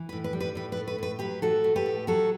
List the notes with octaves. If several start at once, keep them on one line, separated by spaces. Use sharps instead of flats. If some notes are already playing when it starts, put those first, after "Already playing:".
Already playing: E3
B4
A2
B4
G3
B4
A2 B4
B4
A3
B4
A2 B4
F#3 G4 B4
A2 F#4 A4
A3
G4 B4
A2
F#3 F#4 A4